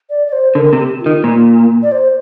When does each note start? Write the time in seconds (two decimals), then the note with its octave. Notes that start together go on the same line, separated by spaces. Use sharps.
0.10 D5
0.27 D5
0.32 C5
0.55 D3 A#4
0.73 C3
0.78 G4
1.00 F4
1.06 D#3
1.24 A#2
1.83 D5
1.92 C5